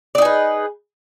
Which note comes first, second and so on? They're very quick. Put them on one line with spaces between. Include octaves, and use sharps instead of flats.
D5 D#4 G#4 B4